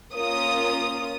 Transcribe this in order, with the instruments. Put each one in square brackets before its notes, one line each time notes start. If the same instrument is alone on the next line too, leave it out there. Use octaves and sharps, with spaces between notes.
[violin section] A#3 C#4 F4 D#6